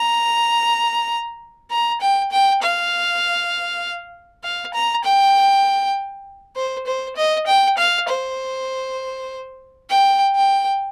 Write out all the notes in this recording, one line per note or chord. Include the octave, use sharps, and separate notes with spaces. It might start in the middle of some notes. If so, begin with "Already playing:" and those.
Already playing: A#5
A#5
G5
G5
F5
F5
A#5
G5
C5
C5
D#5
G5
F5
C5
G5
G5